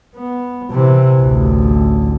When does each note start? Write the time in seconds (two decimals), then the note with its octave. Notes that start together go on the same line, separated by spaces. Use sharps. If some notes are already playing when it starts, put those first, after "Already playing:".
0.15 B3
0.71 C3 E3
1.20 A1 D2